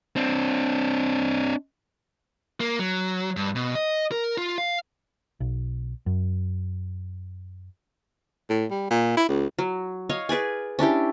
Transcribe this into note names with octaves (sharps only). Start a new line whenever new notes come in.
C4 D4
A#3
F#3
G2
B2
D#5
A#4
F4
F5
B1
F#2
A2
G3
A#2
E4
C#2
F#3
C#5 D#5 F5
G#4 B4 D5 G#5
C#4 D4 E4 G4